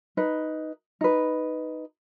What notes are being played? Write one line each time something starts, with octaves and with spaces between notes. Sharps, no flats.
D#4 B4
D#4 B4